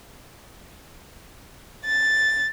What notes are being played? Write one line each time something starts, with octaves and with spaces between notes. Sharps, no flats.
A6